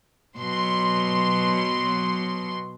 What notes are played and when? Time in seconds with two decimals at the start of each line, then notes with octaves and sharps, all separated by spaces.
0.38 B2 F#3 C6